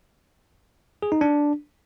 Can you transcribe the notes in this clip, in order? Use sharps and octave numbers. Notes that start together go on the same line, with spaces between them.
G#4
D#4
D4